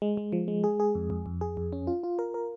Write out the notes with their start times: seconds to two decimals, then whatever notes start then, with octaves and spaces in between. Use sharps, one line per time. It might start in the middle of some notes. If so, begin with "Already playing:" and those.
0.02 G#3
0.17 G#3
0.32 F3
0.48 G#3
0.64 G#4
0.80 G#4
0.95 F2
1.10 F2
1.26 F2
1.41 G#4
1.57 F2
1.73 C#4
1.87 F4
2.03 F4
2.19 A#4
2.34 A#4